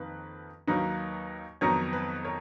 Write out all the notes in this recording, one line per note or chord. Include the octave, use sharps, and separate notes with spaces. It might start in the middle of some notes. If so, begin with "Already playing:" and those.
Already playing: F2 D#3 A#3 B4
D#2 D#3 F#3 A#3 D#4 B4
F2 D#3 F#3 B3 D#4 A#4 C#5
B4
A#4 C#5